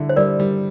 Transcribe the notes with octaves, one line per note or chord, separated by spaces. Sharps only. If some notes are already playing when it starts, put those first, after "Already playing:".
Already playing: D3 G3 E4
C5
G3 A#4 D5
G3